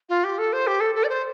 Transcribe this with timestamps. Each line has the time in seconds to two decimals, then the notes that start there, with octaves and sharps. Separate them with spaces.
0.09 F4
0.24 G4
0.38 A4
0.52 C5
0.67 G4
0.80 A4
0.95 A4
1.03 D5
1.09 C5